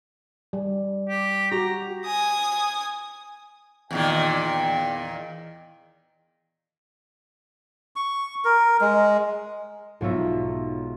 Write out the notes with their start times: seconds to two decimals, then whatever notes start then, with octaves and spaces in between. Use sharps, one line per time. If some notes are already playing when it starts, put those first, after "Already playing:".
0.53 G3
1.09 G4
1.52 F#4 G4 A#5
2.05 G#5 D#6
3.91 E2 A#2 D#3 G5
7.96 C#6
8.45 A#4
8.81 G#3
10.01 B1 G#2 F4 C#5 E5 A#5